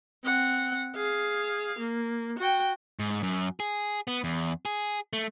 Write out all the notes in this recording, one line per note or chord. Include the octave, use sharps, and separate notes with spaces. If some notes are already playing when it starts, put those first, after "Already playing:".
C4 F#5
G#4 F5
A#3
F#4 G5
G#2
F#2
G#4
B3
E2
G#4
A3